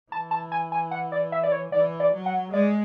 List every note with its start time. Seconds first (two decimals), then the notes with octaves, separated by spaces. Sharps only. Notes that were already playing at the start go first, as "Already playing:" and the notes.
0.12 E3 A5
0.31 A5
0.52 G#5
0.72 G#5
0.91 F#5
1.12 D5
1.32 E5
1.43 D5
1.52 C#5
1.72 E3 D5
2.00 D5
2.13 F#3
2.26 F#5
2.52 G#3 D5